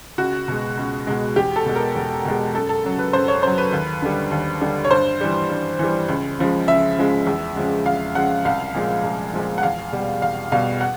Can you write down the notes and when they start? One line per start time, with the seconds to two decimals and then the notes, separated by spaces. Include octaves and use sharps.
0.18 C#2 F#4
0.48 B2 G#3
0.77 C#2
1.07 B2 G#3
1.36 E2 G4
1.56 A4
1.66 B2 G#3
1.76 A#4
1.95 E2
2.25 B2 G#3
2.55 F#2 A4
2.69 A4
2.84 C#3 F#3
2.99 B4
3.13 F#2 C5
3.28 C#5
3.43 C#3 F#3 C5
3.58 B4
3.72 D#2
4.02 D3 G3
4.31 D#2
4.61 D3 G3
4.85 C#5
4.91 G2 C5
5.21 E3 G3
5.50 G2
5.79 E3 G3
6.08 C#2
6.39 C#3 F3 G#3
6.68 C#2 E5
6.98 C#3 F3 G#3
7.27 E2
7.56 C#3 F3 G#3
7.86 E2 F5
8.15 C#3 F3 G#3 F#5
8.45 C2 F5
8.74 A#2 F3 G#3
9.04 C2
9.34 A#2 F3 G#3
9.58 F#5
9.63 E2 F5
9.92 B2 G3
10.22 E2 F5
10.52 B2 G3 F5
10.81 F#5